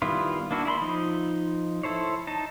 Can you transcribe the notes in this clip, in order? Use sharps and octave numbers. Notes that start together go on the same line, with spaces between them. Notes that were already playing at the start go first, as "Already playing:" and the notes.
D#3 G3 B3 E4 F4
A#3 D4 E4 F#4
E4 G#4 B5 C6
F3 D#4
E4 A4 C5 C#5
D#4 A5